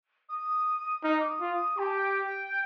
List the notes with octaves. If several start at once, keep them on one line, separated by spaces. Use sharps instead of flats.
D#6
D#4 F6
D6
D#6
F4
D#6
G4 G5
A5
G5